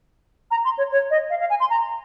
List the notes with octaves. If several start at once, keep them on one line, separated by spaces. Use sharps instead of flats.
A#5
C6
C#5
C#5
D#5
F5
F5
G#5
C6
A#5